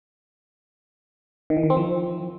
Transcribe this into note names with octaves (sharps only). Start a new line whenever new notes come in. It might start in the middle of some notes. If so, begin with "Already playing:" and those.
D#3
E3
D#3
C4
F3